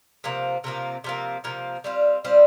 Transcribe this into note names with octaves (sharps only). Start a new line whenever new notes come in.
C3 F3 A#3
C3 F3 A#3
C3 F3 A#3
C3 F3 A#3
G3 C4 F4
G3 C4 F4